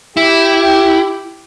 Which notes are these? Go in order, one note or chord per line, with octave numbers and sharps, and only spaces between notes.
E4 G4